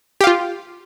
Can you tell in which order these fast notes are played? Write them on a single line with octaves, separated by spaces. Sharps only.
G4 F5 F4